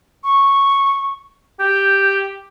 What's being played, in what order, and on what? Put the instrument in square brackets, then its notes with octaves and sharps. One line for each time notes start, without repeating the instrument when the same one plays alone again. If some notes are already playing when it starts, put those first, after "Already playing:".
[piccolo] C#6
[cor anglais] G4 [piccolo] G6